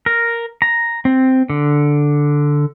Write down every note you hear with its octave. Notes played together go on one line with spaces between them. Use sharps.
A#4
A#5
C4
D3